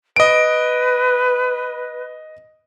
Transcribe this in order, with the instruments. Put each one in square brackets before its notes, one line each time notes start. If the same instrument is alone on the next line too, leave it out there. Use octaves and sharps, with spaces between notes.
[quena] B4 [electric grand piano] D#5 D7